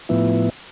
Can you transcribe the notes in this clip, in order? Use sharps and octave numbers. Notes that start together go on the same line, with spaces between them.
A2 F3 B3 E4